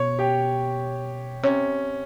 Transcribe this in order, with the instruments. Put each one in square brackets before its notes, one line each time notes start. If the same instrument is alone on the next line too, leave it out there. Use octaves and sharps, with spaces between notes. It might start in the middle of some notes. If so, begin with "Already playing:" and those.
Already playing: [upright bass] B2 [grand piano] C#5
[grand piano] G4
[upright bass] C3 [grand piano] C#4